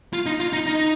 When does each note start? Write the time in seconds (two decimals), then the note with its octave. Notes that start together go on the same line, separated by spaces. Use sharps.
0.13 F4
0.26 D#4
0.40 F4
0.53 D#4
0.67 D#4